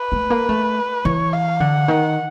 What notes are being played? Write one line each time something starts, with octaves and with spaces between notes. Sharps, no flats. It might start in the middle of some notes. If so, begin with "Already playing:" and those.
Already playing: B4
A3
A#3
A3
E3 C#5
F5
D3 F#5
D#3